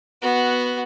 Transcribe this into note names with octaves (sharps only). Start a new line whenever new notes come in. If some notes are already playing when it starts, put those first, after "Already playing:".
B3 F#4